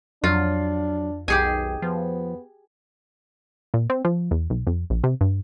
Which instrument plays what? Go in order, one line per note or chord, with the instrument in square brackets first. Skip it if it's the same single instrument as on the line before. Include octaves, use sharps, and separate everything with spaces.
[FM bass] F2 [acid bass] F#3 [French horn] D4 [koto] F4
[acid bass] B1 [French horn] D#3 [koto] G4 G#4 G#5
[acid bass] F3 [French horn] B3
[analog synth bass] A#2
C4
F3
E2
B1
F2
A#1
C3
G2